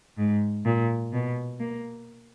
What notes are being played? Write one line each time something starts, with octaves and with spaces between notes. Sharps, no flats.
G#2
A#2
B2
A#3